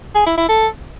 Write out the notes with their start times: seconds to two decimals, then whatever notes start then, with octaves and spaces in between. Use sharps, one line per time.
0.15 G#4
0.26 E4
0.38 E4
0.49 A4